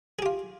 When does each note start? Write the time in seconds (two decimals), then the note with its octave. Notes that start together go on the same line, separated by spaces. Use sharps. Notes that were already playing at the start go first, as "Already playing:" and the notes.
0.19 G#4
0.22 G4
0.26 F4